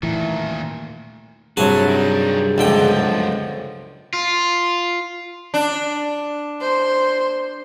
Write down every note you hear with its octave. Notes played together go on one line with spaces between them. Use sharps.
A#2 D#3 E3 A3
G2 C3 F#3 A3 F#4 G#4 G#5 A5
D#3 G3
C#2 F#2 D3 F3 G5
F4
D4
C5